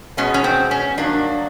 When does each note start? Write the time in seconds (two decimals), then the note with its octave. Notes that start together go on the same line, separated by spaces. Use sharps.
0.17 B2 G#3 B3 C#4
0.34 C#4
0.44 C4
0.71 C#4
0.98 G2 D#3 F#3 A#3 D4